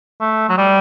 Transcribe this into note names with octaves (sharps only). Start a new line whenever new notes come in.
A3
F#3
G3